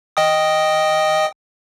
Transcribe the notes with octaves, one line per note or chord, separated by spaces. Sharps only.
D#5 G5 D#6